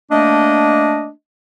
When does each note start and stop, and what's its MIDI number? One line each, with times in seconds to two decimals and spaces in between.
0.11 1.10 57
0.11 1.10 58
0.11 1.10 62
0.11 1.10 75